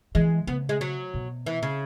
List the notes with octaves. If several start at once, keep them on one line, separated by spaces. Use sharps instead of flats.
E3 G#3
C#3 B3
G#3
F#3
B2
E3
C#3